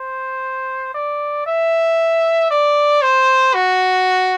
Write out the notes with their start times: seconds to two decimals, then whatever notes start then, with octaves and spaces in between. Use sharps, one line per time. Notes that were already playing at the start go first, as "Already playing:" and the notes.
Already playing: C5
0.94 D5
1.46 E5
2.51 D5
3.02 C5
3.54 F#4